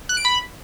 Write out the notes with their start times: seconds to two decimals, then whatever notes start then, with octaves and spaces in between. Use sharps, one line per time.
0.09 F#6
0.17 D7
0.25 B5